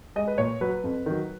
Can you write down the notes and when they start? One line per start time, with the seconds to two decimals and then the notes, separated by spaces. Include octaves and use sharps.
0.16 G#3 D#5
0.28 B4
0.38 A#2 C#5
0.61 F#3 B4
0.84 F2
1.06 D#3 F#3